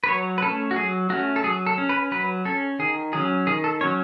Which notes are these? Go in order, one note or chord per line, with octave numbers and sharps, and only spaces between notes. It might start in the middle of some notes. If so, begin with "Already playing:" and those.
B4
F#3 C#5
B4
A3 C#4 A4
F#4
F#3 G#4
A3 C#4 F#4
A4
F#3 G#4
A4
C#4
B4
F#3 B4
C#4 A4
D#3 G#4
F#3 C#4 G#4
D#3 G#4
A4
F#3 C#4 C#5